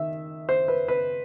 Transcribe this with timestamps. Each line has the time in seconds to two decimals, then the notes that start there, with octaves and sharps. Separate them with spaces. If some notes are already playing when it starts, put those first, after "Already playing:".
Already playing: D#3 E5
0.49 C5
0.68 B4
0.88 B4